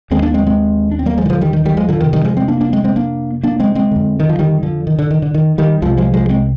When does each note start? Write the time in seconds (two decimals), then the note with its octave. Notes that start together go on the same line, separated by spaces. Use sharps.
0.10 D#2 D3 G#3 C4
0.22 A#3 D4
0.34 G#3 C4
0.47 G#3 C4
0.91 D4
0.99 C4
1.06 G3 A#3
1.18 F3 G#3
1.26 D#3
1.30 D3 F3
1.41 D#3 G3
1.53 D#3
1.65 D#3 G3
1.77 F3 G#3
1.89 D3 F3
2.00 F2 C3 D#3
2.13 D#3 G3
2.25 F3 G#3
2.37 G#3 C4
2.48 A#3 D4
2.61 A#3 D4
2.72 G#3 C4
2.84 G#3 C4
2.96 A#3 D4
3.43 A#3 D4
3.60 G#3 C4
3.75 G#3 C4
3.91 F2 D3
4.20 D#3
4.29 F3
4.39 D#3 G3
4.63 D3 F3
4.87 D#3
4.99 D3
5.11 D#3
5.22 D3
5.34 D#3
5.58 D#3 G3
5.82 C2 C3 F3 G#3
5.97 F3 G#3
6.14 F3 G#3
6.29 G#3 C4